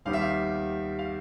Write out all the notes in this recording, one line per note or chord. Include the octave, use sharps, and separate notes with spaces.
D#2 D#3 G3 B3 F5
E5
F5
F5